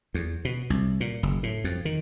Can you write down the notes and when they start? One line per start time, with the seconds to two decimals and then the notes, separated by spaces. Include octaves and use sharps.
0.14 E2
0.45 B2
0.70 C2
1.00 A#2
1.23 F#1
1.43 A2
1.64 F2
1.85 D#3